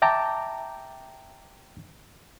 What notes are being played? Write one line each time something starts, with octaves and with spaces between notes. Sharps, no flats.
E5 G5 A5 A#5 D6